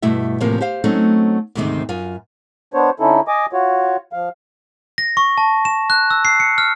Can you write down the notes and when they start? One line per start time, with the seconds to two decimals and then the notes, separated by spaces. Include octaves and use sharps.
0.02 G2 B2 A3 E4 E5
0.40 A2 C3 E3 F3 A#3
0.61 G4 C5 F5
0.84 F#3 A3 C4 C#4 D#4
1.55 D2 G#2 C3 D#3 C4
1.89 F#2 F4 G#5
2.74 B3 D4 C5 C#5
3.00 D3 C#4 D#4 E4 A4
3.28 D#5 G#5 D6
3.53 F4 F#4 C#5
4.13 F3 F5
4.98 A#6
5.17 C#6
5.38 A5
5.65 E7
5.90 F#6
6.10 E6
6.25 C7
6.40 C#7
6.58 F6